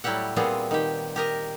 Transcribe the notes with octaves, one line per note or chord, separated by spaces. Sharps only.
A2 F#3 G3 E4 G4 F#5
A#2 G3 B3 C4 G#4
D#3 G4
G4 A#4 D#5